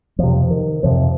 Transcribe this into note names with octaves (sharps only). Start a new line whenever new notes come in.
F2 C3 F3
D#3
F2 C3 F3